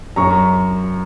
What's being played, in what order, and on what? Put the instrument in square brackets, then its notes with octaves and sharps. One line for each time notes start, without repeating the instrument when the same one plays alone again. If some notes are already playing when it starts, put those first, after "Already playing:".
[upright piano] F#2 A#5 C#6